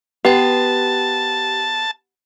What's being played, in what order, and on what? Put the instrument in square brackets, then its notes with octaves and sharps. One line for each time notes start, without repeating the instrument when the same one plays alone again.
[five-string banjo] B3 [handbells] G4 G5 [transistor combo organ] A5